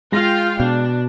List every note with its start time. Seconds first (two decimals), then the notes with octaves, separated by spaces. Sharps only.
0.12 G#3 F4 F5 G5 A#6
0.60 B2 D4